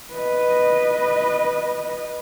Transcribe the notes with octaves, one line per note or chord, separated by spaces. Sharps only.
B4 D#5